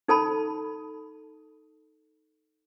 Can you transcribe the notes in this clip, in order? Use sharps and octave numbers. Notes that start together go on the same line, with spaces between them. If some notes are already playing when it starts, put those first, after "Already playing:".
D#4 A4 A5 B5